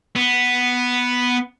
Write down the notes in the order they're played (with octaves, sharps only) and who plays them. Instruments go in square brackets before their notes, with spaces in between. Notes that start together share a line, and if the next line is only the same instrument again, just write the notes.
[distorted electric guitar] B3